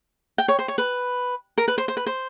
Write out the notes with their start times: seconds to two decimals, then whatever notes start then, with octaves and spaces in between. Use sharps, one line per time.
0.38 G5
0.48 C#5
0.59 C5
0.68 C#5
0.78 B4
1.58 A#4
1.68 B4
1.78 C5
1.88 C5
1.97 B4
2.07 C5